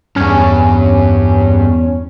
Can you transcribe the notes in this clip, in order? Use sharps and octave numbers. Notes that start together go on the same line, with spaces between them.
E2 G2 C#4